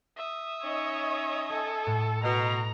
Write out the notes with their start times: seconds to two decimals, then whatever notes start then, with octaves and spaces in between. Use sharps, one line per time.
0.16 E5 D#6
0.63 C#4 D#4 C#5 D#5
1.49 A4 G#5
1.87 A2
2.24 B2 A#5